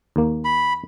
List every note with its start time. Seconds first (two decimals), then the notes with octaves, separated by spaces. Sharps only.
0.16 D#2 A#3
0.45 B5